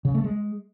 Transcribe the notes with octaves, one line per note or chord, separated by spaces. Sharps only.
C#3
A3
G#3